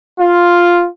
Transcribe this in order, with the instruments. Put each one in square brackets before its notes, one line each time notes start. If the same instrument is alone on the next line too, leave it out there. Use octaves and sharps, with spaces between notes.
[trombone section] F4